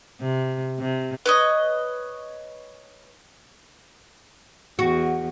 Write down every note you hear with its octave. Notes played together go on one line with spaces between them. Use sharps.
C3
C3
B4 C#5 D#5
E2 F#4